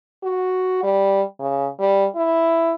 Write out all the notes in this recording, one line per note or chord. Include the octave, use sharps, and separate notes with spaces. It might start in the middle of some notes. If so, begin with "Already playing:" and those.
F#4
G3
C#3
G3
E4